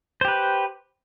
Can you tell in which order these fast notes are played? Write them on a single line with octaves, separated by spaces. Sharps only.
C5 G4 B4